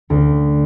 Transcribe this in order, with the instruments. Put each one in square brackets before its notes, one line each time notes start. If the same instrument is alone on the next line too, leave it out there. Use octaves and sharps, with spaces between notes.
[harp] D2